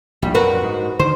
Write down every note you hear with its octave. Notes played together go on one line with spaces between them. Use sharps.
A#1 G2 G3
F#2 A#2 F#4 A#4 B4
G#2
D3 D#3 C5